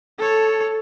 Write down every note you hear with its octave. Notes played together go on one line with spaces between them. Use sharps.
A4 C#5